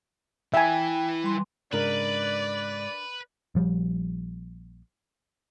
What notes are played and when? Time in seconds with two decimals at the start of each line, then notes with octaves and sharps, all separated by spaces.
0.54 E3 E5 G5 G#5 B5
1.24 G3 C6
1.73 G#2 C#3 D4 A#4 B4 D5
3.55 A#1 F3 G3